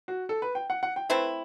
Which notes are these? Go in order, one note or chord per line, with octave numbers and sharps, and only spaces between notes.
F#4
A4
B4
G5
F#5
F#5
G5
A3 C4 E4 B4